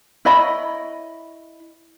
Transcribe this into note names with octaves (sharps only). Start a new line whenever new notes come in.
E4 C#5 D#5 B5